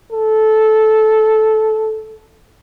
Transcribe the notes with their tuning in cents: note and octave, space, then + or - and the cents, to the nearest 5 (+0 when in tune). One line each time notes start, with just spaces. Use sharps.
A4 -15